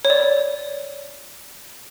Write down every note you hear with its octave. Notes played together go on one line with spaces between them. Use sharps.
C#5
D5